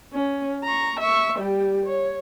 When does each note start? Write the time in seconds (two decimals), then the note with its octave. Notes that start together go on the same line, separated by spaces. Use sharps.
0.14 C#4
0.64 A#5 C#6
0.99 E5 C#6
1.39 G3 G4
1.85 C#5